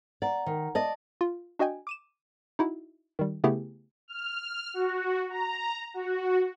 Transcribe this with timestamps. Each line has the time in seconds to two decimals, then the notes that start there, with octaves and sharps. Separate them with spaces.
0.22 D5 F#5 A#5
0.46 D#3
0.75 D5 D#5 A5
1.21 F4
1.59 D4 F#4 D#5 G5 G#5
1.87 D6 D#7 E7
2.59 D#4 E4 F#4
3.19 D#3 G3
3.44 C#3 A3 B3 E4 G4 G#4
4.08 F6
4.74 F#4
5.30 A#5
5.94 F#4